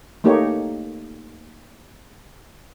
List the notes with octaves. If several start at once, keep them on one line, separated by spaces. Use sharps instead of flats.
A3 A#3 D#4 G4 C#5